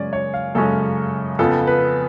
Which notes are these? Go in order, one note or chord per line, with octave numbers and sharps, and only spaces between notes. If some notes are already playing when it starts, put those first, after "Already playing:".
Already playing: F#2 C#3 G#3 C#4 D5 G#5
C#5
F5
F#2 C#3 G#3 C#4 A4
F2 C#3 F3 B3 A4
B4